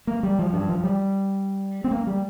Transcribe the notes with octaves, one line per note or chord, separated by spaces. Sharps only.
A#3
G3
F3
G2
F3
G3
C4
A#3
G3